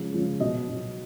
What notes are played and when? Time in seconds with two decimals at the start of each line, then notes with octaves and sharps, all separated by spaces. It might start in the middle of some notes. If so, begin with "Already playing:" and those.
Already playing: C#3 F3 G#3
0.12 C#3 F3 G#3
0.40 B2 F#3 D#5
0.69 B2 F#3